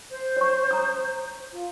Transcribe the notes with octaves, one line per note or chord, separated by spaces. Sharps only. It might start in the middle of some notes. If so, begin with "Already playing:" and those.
C5
C#5 C#6
A#5 D#6
F4